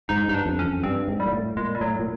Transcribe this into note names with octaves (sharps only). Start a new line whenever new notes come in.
G#2 D#4
G2 D#4
D4
F2
C#4
F2
G2 C4
G#2
G3
A#2
A2
A#2 G#3
G3
A2 F#3
A#2